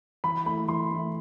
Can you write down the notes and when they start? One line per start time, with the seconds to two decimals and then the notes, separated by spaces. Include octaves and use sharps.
0.24 E3 B5
0.46 A3 E4 B5
0.68 E3 C6
0.91 A3 E4